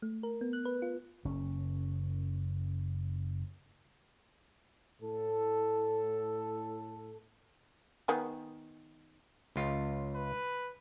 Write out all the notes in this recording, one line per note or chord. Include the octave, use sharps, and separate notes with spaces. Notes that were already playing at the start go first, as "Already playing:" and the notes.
A3
A#4
B3
F#6
B4
F4
F#1 C#4
A2 A4
D#3 B3 G#4
C#2 F4
B4